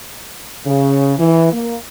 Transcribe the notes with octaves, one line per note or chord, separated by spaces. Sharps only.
C#3
E3
A#3